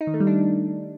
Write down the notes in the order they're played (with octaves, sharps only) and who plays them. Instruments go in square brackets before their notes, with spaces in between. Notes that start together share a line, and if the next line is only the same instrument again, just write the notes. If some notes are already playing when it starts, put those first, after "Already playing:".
[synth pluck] D#4
D#3
A3
G3
D4